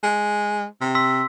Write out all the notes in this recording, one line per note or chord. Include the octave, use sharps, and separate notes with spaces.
G#3
C3
C6 E6 B6